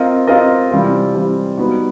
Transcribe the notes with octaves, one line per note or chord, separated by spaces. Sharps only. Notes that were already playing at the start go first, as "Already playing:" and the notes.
Already playing: C4 F4 A#4 D#5
C4 F4 A#4 D#5
C3 E3 G3 C4 F4
C3 E3 G3 C4 F4
G3 B3 D#4 F#4